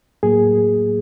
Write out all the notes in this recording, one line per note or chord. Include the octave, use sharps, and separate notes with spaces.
A2 F#3 A#3 G#4